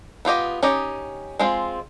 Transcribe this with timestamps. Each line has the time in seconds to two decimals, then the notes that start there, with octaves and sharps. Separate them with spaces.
0.25 B3 F4 G4 D#5
0.63 C#4 D#4 G4 D#5
1.39 G#3 C4 F4